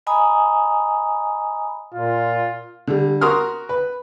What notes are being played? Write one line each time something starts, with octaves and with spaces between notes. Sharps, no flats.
D#5 G#5 A#5 B5 D#6
A#2 F4
D3 G3
F#4 A#4 C6 D#6 F6
B4